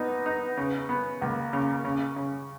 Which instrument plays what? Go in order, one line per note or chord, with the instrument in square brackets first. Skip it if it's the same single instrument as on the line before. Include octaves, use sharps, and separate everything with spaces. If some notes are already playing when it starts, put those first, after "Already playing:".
Already playing: [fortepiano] A#2 D#4 [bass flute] B3
[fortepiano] D#4
C#3
B3
[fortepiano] C#2 [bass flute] A#3
[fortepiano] C#3
C#3
C#3